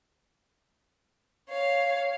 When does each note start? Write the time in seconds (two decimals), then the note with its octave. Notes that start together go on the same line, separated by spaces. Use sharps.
1.49 C#5 F5